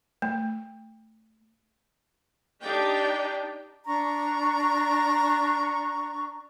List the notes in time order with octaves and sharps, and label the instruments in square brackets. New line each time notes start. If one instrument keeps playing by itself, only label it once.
[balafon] A3
[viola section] D4 D#4 G4 D5 G5
[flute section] D4 A#5 C#6